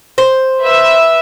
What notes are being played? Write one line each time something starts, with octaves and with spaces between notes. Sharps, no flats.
C5
B4 E5